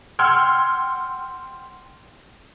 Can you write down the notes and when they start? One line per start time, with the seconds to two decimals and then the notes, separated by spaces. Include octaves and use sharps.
0.19 F#5 G5 C6 E6 F6 G#6